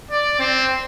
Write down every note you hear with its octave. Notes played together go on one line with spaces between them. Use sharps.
D5
C4